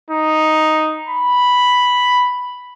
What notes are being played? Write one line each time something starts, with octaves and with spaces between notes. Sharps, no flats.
D#4
B5